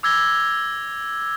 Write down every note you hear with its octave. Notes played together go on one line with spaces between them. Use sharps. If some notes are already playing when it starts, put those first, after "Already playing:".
D6 E6 G#6 A#6 G7